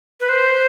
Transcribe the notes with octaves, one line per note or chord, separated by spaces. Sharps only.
B4
C5